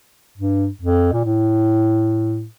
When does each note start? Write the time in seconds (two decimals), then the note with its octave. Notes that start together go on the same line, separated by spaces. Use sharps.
0.38 G2
0.82 F2
1.13 A#2
1.25 A2